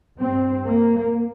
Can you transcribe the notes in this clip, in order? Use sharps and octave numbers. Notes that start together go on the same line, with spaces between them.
G2 C4
A#3